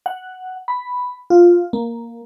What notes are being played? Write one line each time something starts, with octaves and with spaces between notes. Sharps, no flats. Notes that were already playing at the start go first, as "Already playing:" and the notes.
F#5
B5
F4
A#3